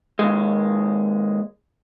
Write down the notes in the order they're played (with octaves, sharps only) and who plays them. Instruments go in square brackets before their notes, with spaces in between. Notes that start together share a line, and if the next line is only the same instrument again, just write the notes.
[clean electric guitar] D#2 G#3